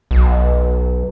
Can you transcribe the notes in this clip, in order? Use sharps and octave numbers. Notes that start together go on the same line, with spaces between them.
B1